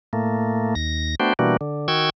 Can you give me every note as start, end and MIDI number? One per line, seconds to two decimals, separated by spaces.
0.13 0.75 45
0.13 0.75 57
0.13 0.75 58
0.75 1.15 39
0.75 1.15 94
1.20 1.33 57
1.20 1.33 59
1.20 1.33 62
1.20 1.33 66
1.20 1.33 72
1.20 1.33 79
1.39 1.57 47
1.39 1.57 52
1.39 1.57 55
1.39 1.57 58
1.39 1.57 62
1.39 1.57 66
1.61 1.88 50
1.88 2.10 51
1.88 2.10 66
1.88 2.10 79
1.88 2.10 85
1.88 2.10 88
1.88 2.10 92